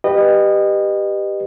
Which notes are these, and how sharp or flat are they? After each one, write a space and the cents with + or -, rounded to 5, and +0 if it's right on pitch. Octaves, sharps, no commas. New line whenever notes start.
G4 +0 B4 +0 D#5 -25